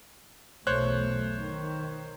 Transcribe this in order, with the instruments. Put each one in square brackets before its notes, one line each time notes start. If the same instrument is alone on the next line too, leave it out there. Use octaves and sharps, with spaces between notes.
[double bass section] B1 E2 A3 [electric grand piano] C5 C#5 F#6
[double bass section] D#3